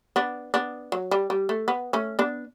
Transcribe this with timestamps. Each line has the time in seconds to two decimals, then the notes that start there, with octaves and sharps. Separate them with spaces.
0.16 B3 D4
0.54 B3 D4
0.92 F#3
1.11 G3
1.30 G3
1.49 A3
1.68 B3
1.93 A3 C#4
2.19 B3 D4